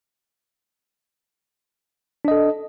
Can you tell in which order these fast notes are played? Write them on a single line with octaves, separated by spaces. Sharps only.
D4 D#5 A4